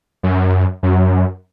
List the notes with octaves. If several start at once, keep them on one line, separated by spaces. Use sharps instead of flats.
F#2
F#2